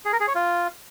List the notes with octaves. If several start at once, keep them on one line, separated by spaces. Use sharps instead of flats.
G#4
A#4
G#4
C#5
F4